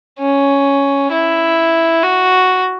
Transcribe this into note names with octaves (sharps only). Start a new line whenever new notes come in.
C#4
E4
F#4